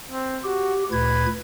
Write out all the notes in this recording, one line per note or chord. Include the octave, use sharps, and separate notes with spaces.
C4
F#4 G4
D2 A#2 B4 G#6